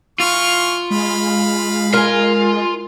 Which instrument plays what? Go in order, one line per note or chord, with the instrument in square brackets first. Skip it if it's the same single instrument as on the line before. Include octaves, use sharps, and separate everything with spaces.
[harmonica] E3 C#6 F6 [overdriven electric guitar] F4
[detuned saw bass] G#3 [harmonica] F5 B5
[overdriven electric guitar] F4 [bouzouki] A#4 G#5